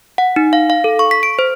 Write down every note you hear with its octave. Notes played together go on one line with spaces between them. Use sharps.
F#5
D#4
F5
F5
A4
C#6
B6
D7
C5